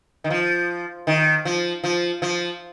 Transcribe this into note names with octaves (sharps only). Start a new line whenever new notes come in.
D#3
F3
D#3
F3
F3
F3